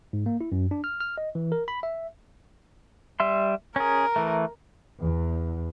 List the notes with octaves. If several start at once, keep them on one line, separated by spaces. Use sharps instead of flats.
G#2
A#3
E4
F#2
D4
F6
F6
D#5
E3
A#4
B5
E5
G3 E5 C6
C#4 G#4 A#4
E3 A3
E2